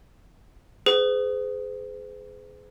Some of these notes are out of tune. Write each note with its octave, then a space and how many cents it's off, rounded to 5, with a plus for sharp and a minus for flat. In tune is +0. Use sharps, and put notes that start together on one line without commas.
G#4 +15 C5 -45